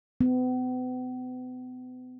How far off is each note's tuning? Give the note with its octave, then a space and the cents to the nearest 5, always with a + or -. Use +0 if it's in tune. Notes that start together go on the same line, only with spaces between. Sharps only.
B3 +40